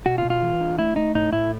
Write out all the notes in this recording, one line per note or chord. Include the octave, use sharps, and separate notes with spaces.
B2 F#4
F4
B2
F4
E3
D4
A3 E4
A3 D#4
A2 D#4
A2 E4